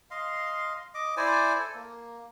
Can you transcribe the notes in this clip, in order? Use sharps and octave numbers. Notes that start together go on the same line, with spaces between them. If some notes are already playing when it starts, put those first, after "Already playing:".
D#5 F5 C6
D#5 D6
E4 C5 D5 G#5
A4
A#3